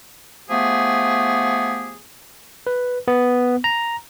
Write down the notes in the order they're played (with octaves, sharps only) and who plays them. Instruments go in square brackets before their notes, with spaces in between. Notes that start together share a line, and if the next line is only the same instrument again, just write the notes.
[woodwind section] F3 A3 B3 G4 G#4
[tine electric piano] B4
B3
A#5